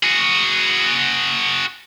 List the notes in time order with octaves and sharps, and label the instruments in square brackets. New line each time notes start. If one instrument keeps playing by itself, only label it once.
[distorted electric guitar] F#4 G#4